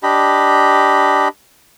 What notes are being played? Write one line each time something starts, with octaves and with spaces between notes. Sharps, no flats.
D4 G4 D#5 B5